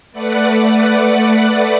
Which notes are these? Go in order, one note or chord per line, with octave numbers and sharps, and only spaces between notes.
A3 B4 D5 F#5